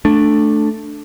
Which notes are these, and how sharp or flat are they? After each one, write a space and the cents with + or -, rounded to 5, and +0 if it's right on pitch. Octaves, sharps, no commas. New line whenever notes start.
A3 +0 D4 +5